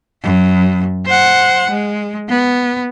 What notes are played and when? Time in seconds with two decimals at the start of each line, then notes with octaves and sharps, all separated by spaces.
0.23 F#2
1.06 C5 F#5
1.70 G#3
2.29 B3